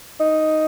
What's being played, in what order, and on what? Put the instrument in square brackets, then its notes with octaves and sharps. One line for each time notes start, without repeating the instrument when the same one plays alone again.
[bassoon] D#4